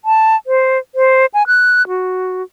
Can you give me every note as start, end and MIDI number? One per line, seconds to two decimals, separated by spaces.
0.05 0.36 81
0.47 0.78 72
0.95 1.26 72
1.34 1.46 80
1.47 1.87 90
1.88 2.43 66